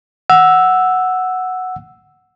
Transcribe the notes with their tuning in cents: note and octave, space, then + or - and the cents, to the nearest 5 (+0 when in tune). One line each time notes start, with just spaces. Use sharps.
F#5 +0 E6 +0